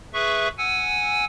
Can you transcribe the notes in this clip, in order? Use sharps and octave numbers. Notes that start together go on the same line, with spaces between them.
G#4 B4 E5 C#6
F#5 G#5 E6